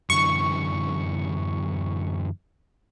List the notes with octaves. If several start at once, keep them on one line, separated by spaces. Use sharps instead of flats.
F#2 D3 E3 C#6